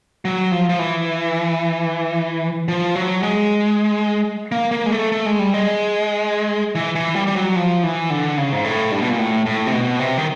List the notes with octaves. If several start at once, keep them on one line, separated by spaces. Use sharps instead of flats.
F#3
F3
F3
E3
F3
F#3
G#3
A#3
A#3
G#3
A3
A3
G#3
G3
G#3
E3
E3
G3
G3
F#3
F3
E3
D3
C#3
G#2
A2
G2
B2
A#2
A2
A2
C3
B2
C3
D#3